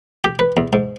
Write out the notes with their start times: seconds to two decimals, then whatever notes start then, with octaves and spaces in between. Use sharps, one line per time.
0.24 G4
0.39 B4
0.57 E2
0.73 G#2